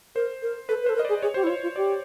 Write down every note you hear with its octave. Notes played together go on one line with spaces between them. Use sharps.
A#4 C5
A#4
A4 B4
B4
C5
A4
A#4
D#5
D5
G#4
G#4 C#5
G4 C5
E4
F4 C#5
F4
G4 D5